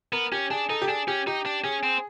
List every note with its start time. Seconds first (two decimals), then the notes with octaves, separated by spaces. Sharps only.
0.13 B3 A#4
0.32 C#4 G4
0.51 D4 G#4
0.70 D#4 A4
0.82 G4
0.88 D4 G#4
1.08 C#4 G4
1.27 D#4 G4
1.46 D4
1.64 C#4 G#4
1.83 C4